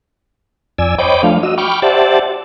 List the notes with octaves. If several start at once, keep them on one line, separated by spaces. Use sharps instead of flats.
F2 D5 G#5 E6
C5 C#5 D#5 G5 B5 D6
F3 A3 D4 F5
F#4 D#5 E6
G5 B5 C#6 D6 F6
G4 C5 D5 E5 F#5 A5